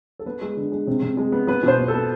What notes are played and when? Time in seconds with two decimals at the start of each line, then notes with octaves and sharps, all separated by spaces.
0.19 A4
0.26 B3 B4
0.42 G#3
0.57 D3
0.72 G#3
0.87 C3
1.02 C3
1.17 G#3
1.32 B3
1.47 B3 B4
1.63 B2 C5
1.78 B3
1.88 A4
1.94 B3